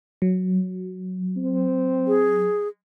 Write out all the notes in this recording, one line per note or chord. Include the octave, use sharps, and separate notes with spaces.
F#3
C4
G#4